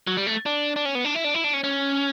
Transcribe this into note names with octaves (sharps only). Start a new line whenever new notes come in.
F#3
G3
A3
D4
D4
C#4
B3
D4
E4
D4
E4
D4
C#4
C#4